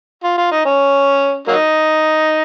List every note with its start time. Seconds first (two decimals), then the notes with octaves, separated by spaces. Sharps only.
0.24 F4
0.38 F4
0.52 D#4
0.65 C#4
1.48 F#3 A#3 D#4